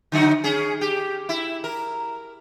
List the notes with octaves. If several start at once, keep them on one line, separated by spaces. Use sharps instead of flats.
D3 F#3 D#4
C#4 G#4
G4
E4
A#4